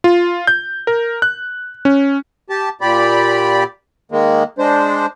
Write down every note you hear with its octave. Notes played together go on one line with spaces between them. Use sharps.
F4
G6
A#4
F#6
C#4
G4 A5
A#2 G4 D5 B5
D#3 G#3 A#3
G#3 D4 C5